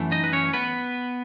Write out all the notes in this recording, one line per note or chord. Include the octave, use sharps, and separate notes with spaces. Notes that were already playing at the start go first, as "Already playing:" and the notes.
Already playing: F#2 E3 A3
D#4 D#5
B4
C#4 C#5
B3 B4